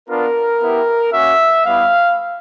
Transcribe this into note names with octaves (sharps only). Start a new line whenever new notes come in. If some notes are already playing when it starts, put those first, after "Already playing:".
B3 D4 F4 A#4
B3 E4 G4
A#3 C#4 F#4 E5
G3 B3 E4 F5